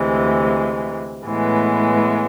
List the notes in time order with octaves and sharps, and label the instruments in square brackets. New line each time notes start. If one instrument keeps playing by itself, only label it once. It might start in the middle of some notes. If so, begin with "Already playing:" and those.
Already playing: [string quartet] D2 C3 E3 G#3
A2 E3 G#3 B3